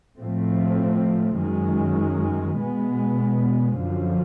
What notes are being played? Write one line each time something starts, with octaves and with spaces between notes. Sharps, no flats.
A2 F3 A3 C4
F#2 D#3 G#3
B2 G#3 B3
F#2 D3 F3